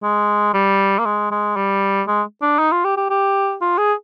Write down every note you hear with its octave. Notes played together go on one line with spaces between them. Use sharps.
G#3
G3
A#3
G#3
G#3
G3
G#3
D4
D#4
F4
G4
G4
G4
F4
G#4